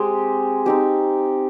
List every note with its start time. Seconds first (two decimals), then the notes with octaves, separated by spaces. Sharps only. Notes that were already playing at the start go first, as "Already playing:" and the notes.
Already playing: G#3 C4 G4 C5
0.66 C4 D#4 G4 C5